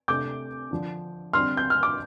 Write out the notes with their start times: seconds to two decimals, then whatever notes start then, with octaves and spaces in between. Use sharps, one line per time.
0.08 C3 A3 D4 D6 G6
0.71 D3 F3 D4
1.33 D3 G3 C4 C6 F6
1.57 G6
1.70 F6
1.83 D6